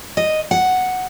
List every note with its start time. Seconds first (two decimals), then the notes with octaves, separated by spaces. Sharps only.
0.17 D#5
0.51 F#5